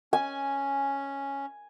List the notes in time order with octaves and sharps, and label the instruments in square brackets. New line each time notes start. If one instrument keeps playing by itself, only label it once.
[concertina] C#4 [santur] G#5